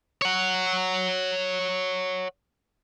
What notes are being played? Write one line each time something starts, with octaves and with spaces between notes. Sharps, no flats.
C#5 F#5